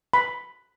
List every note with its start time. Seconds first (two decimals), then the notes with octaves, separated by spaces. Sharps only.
0.14 B5